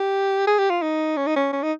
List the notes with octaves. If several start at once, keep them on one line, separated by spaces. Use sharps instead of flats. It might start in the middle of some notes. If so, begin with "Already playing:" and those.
Already playing: G4
G#4
G4
F4
D#4
C#4
D#4
C#4
C#4
D#4